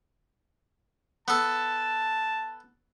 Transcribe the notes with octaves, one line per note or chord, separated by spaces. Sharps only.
B3 A4 A5